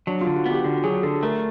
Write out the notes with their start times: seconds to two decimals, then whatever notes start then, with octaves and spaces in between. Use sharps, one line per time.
0.07 F#3 D4
0.21 D3 F4
0.36 F#4
0.46 B3 G4
0.64 D3 F#4
0.84 F#3 G#4
1.03 D3 A4
1.23 A3 A#4